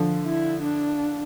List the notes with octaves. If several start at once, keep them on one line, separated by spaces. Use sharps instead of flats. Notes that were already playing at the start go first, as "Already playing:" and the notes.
Already playing: D3 F3
E4
D4